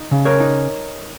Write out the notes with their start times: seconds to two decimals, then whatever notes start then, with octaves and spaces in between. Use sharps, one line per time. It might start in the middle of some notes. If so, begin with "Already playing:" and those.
Already playing: D#4
0.11 C#3
0.25 A#4 C#5
0.40 D#4